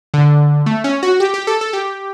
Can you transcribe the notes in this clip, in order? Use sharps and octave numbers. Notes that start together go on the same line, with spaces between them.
D3
A3
C#4
F#4
G4
G4
A4
A4
G4